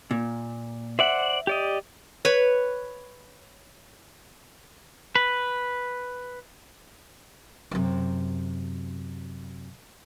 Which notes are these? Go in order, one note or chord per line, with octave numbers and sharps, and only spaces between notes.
A#2
C5 D5 E5 F#5
G4 D5 D#5
B4 C#5 B5
B4
F#2 C3